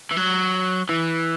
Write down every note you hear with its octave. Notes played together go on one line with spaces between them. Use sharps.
E3
F#3
E3